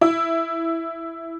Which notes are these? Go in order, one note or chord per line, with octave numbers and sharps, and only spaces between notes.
E4